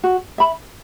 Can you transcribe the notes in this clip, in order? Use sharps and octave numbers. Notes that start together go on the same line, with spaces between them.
F#4
E5 B5